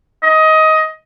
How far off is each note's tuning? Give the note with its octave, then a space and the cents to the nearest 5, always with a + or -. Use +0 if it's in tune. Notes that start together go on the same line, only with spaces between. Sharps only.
D#5 +20